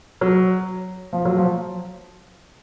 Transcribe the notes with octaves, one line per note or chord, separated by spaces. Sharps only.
F#3
F3
F#3
F3